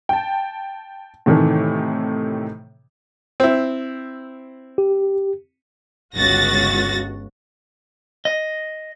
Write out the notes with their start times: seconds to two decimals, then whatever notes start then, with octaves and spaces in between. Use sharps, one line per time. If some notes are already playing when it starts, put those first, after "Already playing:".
0.09 G5 A5
1.26 A2 C3 D#3 E3 A3
3.40 C4 E4
4.78 G4
6.16 G1 C#2 F#4 A6 A#6
8.25 D#5